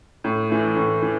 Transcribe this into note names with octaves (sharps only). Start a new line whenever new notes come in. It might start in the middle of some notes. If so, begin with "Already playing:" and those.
A2
E3 A3
A2
E3